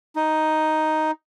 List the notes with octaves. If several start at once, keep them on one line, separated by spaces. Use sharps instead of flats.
D#4